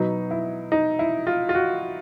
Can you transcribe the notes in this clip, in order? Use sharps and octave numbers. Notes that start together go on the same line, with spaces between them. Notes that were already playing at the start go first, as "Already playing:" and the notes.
Already playing: B2 F#3 B3 D#4
E4
D#4
E4
F4
F4
F#4